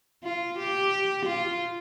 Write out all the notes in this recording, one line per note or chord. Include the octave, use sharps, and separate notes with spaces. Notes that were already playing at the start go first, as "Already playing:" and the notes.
F4
G4
F4